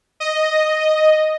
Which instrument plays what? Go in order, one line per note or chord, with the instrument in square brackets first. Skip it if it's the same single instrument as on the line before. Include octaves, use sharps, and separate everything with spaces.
[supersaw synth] D#5